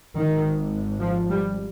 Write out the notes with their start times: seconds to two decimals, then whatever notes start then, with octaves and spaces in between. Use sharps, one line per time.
0.17 G#1 G#2 D#3
1.01 F3
1.30 G3